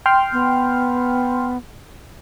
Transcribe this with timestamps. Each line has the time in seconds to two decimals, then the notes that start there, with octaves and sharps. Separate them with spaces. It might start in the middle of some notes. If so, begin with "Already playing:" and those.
0.06 G5 C6 F6
0.33 B3